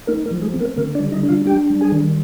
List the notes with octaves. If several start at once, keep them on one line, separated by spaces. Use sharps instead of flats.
A#3 D#4 A#4
A#3 A#4
F3
G#3 G#4
C4
A#3 A#4
D3 A#3 A#4
D4 D5
G3
D#4 D#5
D4
F4 F5
D4 G4 G5
G3
G#4 G#5
D#3